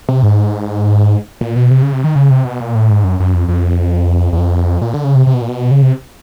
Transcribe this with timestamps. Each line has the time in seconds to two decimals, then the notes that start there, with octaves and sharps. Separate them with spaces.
0.09 C3
0.23 G#2
1.41 A#2
1.56 B2
1.71 C3
1.82 C#3
1.93 C3
2.04 D#3
2.15 C#3
2.30 C3
2.45 B2
2.60 A#2
2.75 A2
2.90 G#2
3.04 F#2
3.20 F#2
3.34 F2
3.49 F2
4.33 E2
4.38 F2
4.82 A#2
4.94 D3
5.04 C#3
5.15 C3
5.27 C3
5.34 B2
5.42 A#2
5.48 B2
5.71 C#3
5.82 C3